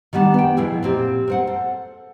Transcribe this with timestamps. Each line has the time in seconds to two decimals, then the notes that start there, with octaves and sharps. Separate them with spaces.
0.13 D#3 G3 B3 D4
0.34 B3 G5
0.57 B2 F3 E4 G#4
0.83 A#2 C4 G4
1.28 A#4 C5 F#5
1.47 A4